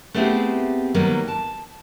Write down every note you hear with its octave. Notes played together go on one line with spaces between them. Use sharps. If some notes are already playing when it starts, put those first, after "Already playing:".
A3 B3 C4 E4 G4 G#4
D#3 F#3 G3 A#3 B3
A5